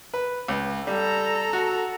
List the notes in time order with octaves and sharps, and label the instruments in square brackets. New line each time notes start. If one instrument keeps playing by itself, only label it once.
[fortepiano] B4
C#2
[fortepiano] G3 [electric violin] A4 A#5
[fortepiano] F#4